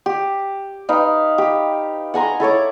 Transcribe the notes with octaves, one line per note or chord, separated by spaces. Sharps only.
G4
D#4 B4 F5 G5
G4
F#5 G#5 A#5 C6
E4 A4 C#5 D6